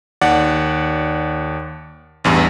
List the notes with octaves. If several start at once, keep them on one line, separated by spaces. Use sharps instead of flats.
D#2 D5 F#5
A1 E2 G2